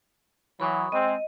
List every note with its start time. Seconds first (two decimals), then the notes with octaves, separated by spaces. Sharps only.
0.60 E3 F#3 B5 C#6 D#6
0.92 G#3 C4 D#5